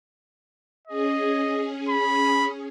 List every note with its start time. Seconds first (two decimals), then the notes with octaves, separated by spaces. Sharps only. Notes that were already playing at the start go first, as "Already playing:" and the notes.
0.87 C#4 G#4 D#5
1.89 B5